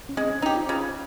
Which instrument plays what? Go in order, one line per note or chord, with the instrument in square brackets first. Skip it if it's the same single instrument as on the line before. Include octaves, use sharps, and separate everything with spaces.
[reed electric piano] C#4
[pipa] G#3 [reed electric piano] C4
[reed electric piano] C#4
[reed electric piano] C#4 [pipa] D#4 G4
[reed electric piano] F4
[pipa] C#3